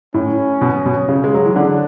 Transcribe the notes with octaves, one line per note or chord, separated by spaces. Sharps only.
A2 C#4
B2
B2
C#3
G#3
F#3
E3
D3 D4